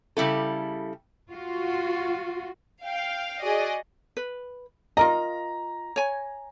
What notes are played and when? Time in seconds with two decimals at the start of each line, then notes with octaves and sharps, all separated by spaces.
0.17 C#3 G3 E4 A4
1.30 F4 F#4
2.85 F5 G5
3.43 F#4 G#4 D5 D#5
4.17 B4
4.97 F4 A#4 D#5 A#5
5.96 C#5 G#5